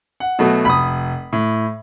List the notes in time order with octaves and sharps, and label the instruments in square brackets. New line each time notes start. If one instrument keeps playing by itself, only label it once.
[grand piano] F#5
[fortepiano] B2 F#3 A3
[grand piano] F1 [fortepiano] B5 D#6
[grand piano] A2